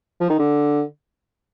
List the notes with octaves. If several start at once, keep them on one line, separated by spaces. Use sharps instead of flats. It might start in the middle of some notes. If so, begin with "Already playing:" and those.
F3
D#3
D3